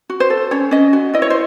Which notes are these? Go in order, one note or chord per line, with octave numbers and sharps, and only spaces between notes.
F#4
C5
A4
C#4 C#5
C#4 D#5
F#4
E4 D#5
C#5
C5